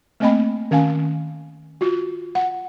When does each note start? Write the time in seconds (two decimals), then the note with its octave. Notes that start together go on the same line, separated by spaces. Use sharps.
0.20 A3 A#3 C4 D#5 G5 B5
0.71 D#3 C#4 F5 G#5
1.81 F4 F#4
2.35 F#5